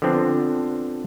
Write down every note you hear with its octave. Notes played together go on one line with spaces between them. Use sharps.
D3 F3 B3 C4 D4